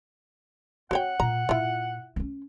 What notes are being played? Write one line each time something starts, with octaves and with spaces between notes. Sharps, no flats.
C4 F#4 C#5 F#5 G5
A#2 A#5
A#2 E4 F4
C4 C#4